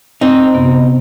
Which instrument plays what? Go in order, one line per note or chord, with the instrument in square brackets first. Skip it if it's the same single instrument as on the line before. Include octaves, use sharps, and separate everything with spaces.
[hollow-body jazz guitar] C4 D#4
[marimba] F#2 C3 B3